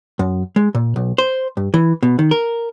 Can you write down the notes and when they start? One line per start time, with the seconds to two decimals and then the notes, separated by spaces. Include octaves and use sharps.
0.19 F#2
0.56 G#3
0.75 A#2
0.96 B1
1.18 C5
1.57 G2
1.74 E3
2.03 B2
2.19 D#3
2.31 A#4